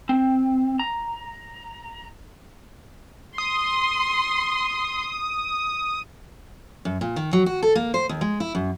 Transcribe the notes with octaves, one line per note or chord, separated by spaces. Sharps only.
C4
A#5
C6 D#6
F#2
A#2
D#3
F#3
F#4
A4
A#3
C5
D#2
G#3
E4
F#2